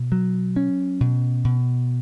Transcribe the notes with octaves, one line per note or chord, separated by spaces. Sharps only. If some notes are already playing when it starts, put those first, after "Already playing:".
Already playing: B2
F#3
C#4
B2
B2